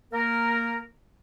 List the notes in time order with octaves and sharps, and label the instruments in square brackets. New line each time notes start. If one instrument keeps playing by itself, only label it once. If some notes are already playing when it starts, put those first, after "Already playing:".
[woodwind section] A#3 A#4